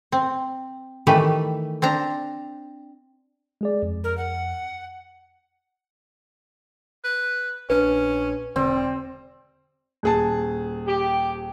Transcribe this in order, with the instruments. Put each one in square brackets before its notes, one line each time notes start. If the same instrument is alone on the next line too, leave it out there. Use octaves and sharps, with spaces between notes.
[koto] C4
D#3 E3 A3 G4 B4
C4 D4 A#5
[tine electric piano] G#3 G#4 D5
F2
[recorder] A#4
F#5
[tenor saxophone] B4
[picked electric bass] A#1 D4 [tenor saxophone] C#4 [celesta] B4
[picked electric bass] E1 D3 [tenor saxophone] G3 [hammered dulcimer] C4
[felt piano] D#1 G#4 A5
[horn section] G4